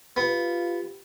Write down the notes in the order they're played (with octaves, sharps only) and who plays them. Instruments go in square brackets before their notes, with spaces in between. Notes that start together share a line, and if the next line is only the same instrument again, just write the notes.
[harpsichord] B3 [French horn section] F4 G4